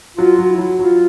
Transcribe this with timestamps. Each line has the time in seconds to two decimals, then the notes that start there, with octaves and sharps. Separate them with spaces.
0.18 F#3 F4
0.39 F#3
0.48 E4
0.58 F#3
0.79 F#3 F4